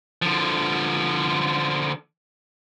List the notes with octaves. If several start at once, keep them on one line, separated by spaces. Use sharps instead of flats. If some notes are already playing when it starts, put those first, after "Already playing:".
D3 F3